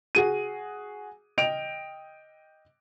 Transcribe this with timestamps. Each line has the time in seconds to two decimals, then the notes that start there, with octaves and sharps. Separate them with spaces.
0.15 F#4 G#4 D#7
1.38 D#5 G5 D7 F7